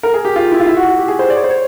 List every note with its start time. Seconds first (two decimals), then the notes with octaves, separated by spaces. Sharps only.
0.03 A#4
0.14 G#4
0.25 G4
0.36 F4
0.51 E4
0.60 F4
0.67 E4
0.77 F#4
0.88 F#4
0.98 G4
1.08 G#4
1.19 C5
1.30 D5
1.36 C#5
1.44 C5
1.50 C#5